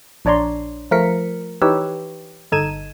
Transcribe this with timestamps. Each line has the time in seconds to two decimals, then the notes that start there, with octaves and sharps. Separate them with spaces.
0.25 A#1 D4 C#5 D5 A#5 C6
0.91 F3 A3 A#4 B6 C#7
1.62 E3 D#4 G4 B4 C#5 E6
2.52 G1 D#4 A4 G#6 D#7 E7